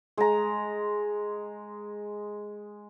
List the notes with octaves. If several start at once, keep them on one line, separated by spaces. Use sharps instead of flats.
G#3 A#5